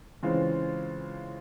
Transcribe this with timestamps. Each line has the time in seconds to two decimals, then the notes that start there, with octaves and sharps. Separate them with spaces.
0.23 C#3 E3 G#3 C4 F4